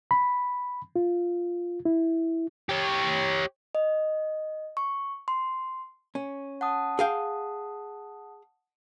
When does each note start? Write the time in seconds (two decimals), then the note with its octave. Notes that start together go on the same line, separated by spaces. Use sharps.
0.11 B5
0.96 F4
1.85 E4
2.69 G4 C#5
3.75 D#5
4.77 C#6
5.28 C6
6.15 C#4
6.61 F#5 A5 D#6
6.99 G#4 F5 G5